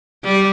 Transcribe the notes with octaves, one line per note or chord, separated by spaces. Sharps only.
G3